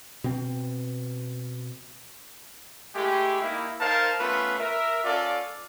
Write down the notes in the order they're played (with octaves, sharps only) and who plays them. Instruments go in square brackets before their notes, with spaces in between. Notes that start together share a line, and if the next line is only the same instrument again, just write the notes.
[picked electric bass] B2 C4
[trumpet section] G#3 A3 E4 G4
A#3 D#4 E4
D#4 A#4 C5 F5 A5
A3 B3 C#4 F4 B4
A#4 E5
C#4 F4 A4 D5